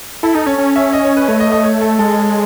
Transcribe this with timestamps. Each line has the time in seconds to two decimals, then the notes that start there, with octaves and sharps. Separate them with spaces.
0.23 E4 A4
0.35 D#4 A4
0.47 C#4 C#5
0.58 C#4
0.76 E5
0.93 D#5
1.05 C#5
1.17 B4
1.28 A3 C#5
1.40 D#5
1.52 D#5
1.64 C#5
1.81 A4
1.99 G#3 A4